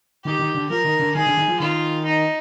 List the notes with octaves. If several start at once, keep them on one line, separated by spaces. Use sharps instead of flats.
D#3 G4
D#3
D3
F3 A#4
D#3
D3
D#3 G#4
D3
D#3
F3
D#3 F4
D#4